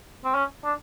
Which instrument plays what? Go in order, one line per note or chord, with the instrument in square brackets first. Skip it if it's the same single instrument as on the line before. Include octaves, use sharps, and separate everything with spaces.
[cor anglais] C4
C#4
D4